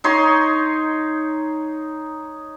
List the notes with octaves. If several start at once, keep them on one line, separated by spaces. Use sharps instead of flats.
D#4 C#5 C6